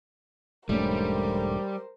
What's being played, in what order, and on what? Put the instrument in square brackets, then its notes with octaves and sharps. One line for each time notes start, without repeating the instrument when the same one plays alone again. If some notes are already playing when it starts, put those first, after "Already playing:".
[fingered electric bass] E1 G#2 [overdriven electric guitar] G3 [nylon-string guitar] A3 C#4 D4 [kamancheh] A#4 C5